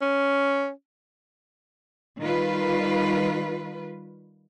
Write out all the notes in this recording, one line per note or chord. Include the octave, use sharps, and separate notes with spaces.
C#4
D#3 G3 F4 B4